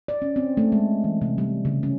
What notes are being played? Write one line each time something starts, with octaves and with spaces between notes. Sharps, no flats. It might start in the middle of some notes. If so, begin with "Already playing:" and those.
D5
C#4
C4
A3
G#3
E3
C3
G3
C#3
C#4